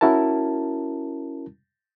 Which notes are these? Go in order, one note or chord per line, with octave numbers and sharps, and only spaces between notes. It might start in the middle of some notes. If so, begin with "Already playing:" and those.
C#4 E4 F#4 A#4 A5